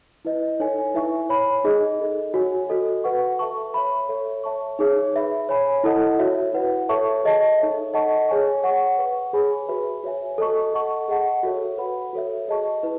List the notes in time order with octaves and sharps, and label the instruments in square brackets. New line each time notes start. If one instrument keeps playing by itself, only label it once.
[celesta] E4 B4 D#5
D#4 A4 C#5 G#5
E4 B4 E5 G#5 C#6
C#5 G#5 B5
D#4 G#4 D#5
D#4 A4 D#5
F#4 C#5 G#5
F#4 A4 D#5
B4 F#5 C#6
A4 E5 A5 C#6
C#5 E5 B5
A4 C#5 E5
C#5 E5 A5 C#6
D#4 G#4 C#5 E5
B4 E5 B5
C#5 G#5 B5
E4 A4 D#5 F#5 A5
F#4 C#5 E5
E4 B4 F#5
A4 C#5 E5 A5 C#6
G#4 D#5 A5
D#4 A4 C#5 E5
A4 D#5 F#5 A5 C#6
G#4 C#5 G#5 C#6
C#5 F#5 C#6
B4 F#5 C#6
G#4 C#5 G#5 B5
F#4 B4 E5 B5
F#4 C#5 E5 G#5
A4 D#5 A5 C#6
A4 D#5 F#5 A5 C#6
G#4 D#5 F#5 A5
F#4 A4 C#5 E5
B4 F#5 B5
F#4 A4 C#5 E5
G#4 D#5 A5 C#6
E4 B4